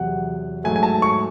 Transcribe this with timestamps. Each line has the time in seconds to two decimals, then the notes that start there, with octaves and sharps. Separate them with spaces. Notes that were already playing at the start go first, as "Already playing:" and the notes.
Already playing: E2 C3 F#3 F#5
0.64 G#2 F#3 A3 G#5
0.76 G#5
0.83 A5
1.02 C#6